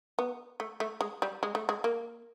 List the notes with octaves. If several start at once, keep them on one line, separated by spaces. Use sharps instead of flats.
B3
A3
A3
G#3
G3
G#3
A3
G#3
A#3